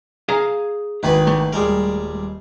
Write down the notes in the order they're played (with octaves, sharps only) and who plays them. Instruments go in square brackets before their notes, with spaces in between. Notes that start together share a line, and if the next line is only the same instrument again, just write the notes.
[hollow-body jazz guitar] G#4 F5 A#5
[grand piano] G#1 D#3 [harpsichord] E4 G#4 B4
[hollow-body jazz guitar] A3
[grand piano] D#1 G#4 [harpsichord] G3 G#3 A#4